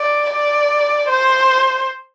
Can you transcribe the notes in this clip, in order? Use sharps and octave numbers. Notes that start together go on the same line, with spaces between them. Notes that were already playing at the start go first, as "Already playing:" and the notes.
Already playing: D5
D5
C5